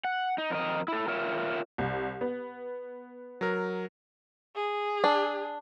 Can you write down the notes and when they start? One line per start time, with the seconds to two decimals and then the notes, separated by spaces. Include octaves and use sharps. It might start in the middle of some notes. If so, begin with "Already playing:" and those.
0.05 F#5
0.38 D#4
0.50 F2 A#4 D#5
0.88 E4 A4
1.08 F4 A#4 C#5 E5
1.78 C2
2.21 B3
3.41 F#3 A#4
4.56 G#4
5.04 D4